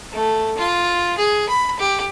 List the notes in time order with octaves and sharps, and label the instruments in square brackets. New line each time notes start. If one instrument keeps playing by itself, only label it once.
[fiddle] A3
F4
G#4
B5
G4